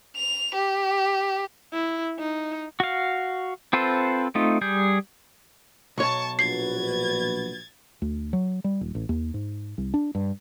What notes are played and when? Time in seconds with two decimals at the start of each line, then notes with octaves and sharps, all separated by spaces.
0.16 F7
0.55 G4
1.73 E4
2.20 D#4
2.80 F#4 F5
3.73 C4 F4 A4 B4 C5
4.35 A3 C4 D#4 F4
4.61 G3 G#4 G6
5.98 B1 C#5 A5 C#6
6.39 A#1 F#4 B4 G#6 A6 C7
8.02 D2
8.33 F#3
8.64 G3
8.81 D#1
8.95 A1
9.09 D#2
9.34 G#2
9.78 C2
9.94 D4
10.15 G2